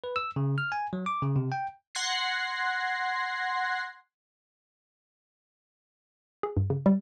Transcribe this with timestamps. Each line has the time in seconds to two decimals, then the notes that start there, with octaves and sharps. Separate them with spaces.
0.04 B4
0.16 E6
0.36 C#3
0.58 F6
0.72 G#5
0.93 F#3
1.06 D6
1.22 C#3
1.36 C3
1.52 G5
1.95 F#5 C6 F#6 G#6 A#6 C7
6.43 G#4
6.57 G2
6.70 C#3
6.86 G3